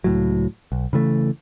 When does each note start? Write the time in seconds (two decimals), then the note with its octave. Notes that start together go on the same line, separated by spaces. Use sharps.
0.04 C#2 A2 F#3
0.72 B1
0.93 C#3 E3 A3